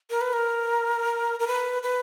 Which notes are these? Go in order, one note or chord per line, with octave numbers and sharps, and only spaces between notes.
A#4
B4
A#4
A#4
B4
B4